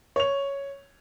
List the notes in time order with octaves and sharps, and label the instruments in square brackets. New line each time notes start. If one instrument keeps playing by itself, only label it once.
[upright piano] C#5 F7